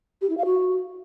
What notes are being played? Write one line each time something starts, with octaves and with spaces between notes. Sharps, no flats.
G4
E4
F5
F#4